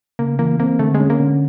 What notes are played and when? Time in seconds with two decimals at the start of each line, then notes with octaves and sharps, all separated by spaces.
0.19 C#3 A#3
0.39 E3 A#3
0.60 A#3 C4
0.79 D3 A3
0.94 G#3
1.00 C#4
1.10 A#3
1.20 D3